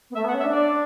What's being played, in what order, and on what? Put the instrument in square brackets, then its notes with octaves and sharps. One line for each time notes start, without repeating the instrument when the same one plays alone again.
[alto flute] B3
[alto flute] A3 [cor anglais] E5
[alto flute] B3
[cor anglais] F#5
[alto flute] C#4
[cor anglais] E5
[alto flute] D4
[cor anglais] D5